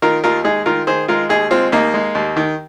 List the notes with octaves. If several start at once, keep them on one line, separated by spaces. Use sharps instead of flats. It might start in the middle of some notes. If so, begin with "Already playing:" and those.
D#3 F4 A#4
D#2 F4 A#4
G#3 D#4 G#4
D#3 F4 A#4
D#3 G#4 C5
G#3 F4 A#4
D#2 D#4 G#4
G#3 C4 F4
D#2 A#3 D#4
G#3
D#2
D#3